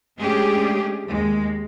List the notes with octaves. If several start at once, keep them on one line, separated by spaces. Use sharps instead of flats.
G#3 A3 C#4 D4 G4 G#4
D#2 G#3